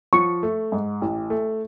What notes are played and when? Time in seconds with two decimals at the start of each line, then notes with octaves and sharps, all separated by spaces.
0.13 F3 C#6
0.43 A3
0.72 G#2
1.01 A1
1.30 A3